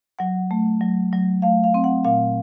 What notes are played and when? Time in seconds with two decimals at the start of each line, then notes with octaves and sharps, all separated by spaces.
0.19 F#3 F#5
0.51 A3
0.81 F#3
1.13 F#3
1.42 A3 F5
1.64 F5
1.74 C4
1.84 F#5
2.05 A#2 F5